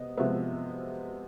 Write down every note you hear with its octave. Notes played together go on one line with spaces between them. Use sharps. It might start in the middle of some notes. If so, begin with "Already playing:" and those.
Already playing: C3 B3 D#5
C3 F3 G#3 B3 E5